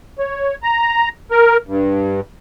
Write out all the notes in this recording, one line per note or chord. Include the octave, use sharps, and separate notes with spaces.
C#5
A#5
A#4
G2